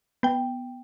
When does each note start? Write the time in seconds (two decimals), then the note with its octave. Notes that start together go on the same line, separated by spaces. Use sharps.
0.23 B3 G5